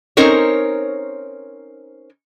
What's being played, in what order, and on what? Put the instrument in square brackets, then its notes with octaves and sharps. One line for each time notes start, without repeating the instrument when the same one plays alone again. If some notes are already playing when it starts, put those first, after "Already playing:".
[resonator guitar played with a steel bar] C4 C#4 D#4 A#4 C5 C#5